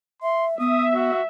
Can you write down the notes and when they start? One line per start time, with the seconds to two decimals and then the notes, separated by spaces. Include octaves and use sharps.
0.22 E5 C6
0.59 B3 E5 D#6
0.94 F#4